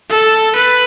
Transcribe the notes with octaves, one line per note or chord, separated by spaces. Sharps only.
A4
B4